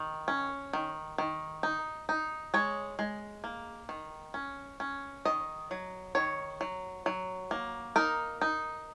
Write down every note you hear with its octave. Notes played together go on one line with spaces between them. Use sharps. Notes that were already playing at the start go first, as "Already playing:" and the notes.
Already playing: D#3
C#4
D#3
D#3
D#4
D#4
G#3 C#5
G#3
A#3
D#3
C#4
C#4
D#3 D#5
F#3
D#3 C#5
F#3
F#3
A#3
D#4 A#4
D#4